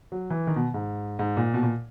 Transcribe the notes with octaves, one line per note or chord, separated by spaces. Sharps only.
F#3
E3
D#3
B2
G#2
G#2
A#2
B2
A#2